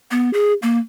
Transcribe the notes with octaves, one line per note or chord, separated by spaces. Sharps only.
B3
G#4
A#3